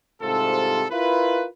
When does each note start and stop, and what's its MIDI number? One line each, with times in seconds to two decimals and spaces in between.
0.22 0.84 36
0.22 0.84 44
0.22 0.84 48
0.22 0.84 65
0.22 0.84 69
0.90 1.46 64
0.90 1.46 65
0.90 1.46 70
0.90 1.46 71